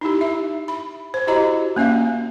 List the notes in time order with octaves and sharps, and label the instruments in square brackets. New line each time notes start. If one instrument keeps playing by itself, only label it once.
[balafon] D#4 E4 G4
D#4 E5
B5
C5
E4 F#4 G4 D#5 A#5
A#3 C#4 E5 F5